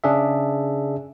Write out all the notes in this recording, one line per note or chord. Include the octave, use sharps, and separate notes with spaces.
C#3 D4 G#4 E5